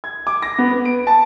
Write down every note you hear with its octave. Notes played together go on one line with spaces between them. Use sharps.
G#6
D6
A#6
B3
B4
D7
A5